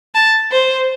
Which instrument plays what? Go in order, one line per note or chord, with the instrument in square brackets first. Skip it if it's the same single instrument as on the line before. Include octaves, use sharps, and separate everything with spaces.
[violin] A5
C5